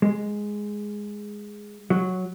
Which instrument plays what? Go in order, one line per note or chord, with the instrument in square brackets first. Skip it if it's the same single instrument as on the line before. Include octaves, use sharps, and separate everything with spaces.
[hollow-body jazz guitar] G#3
F#3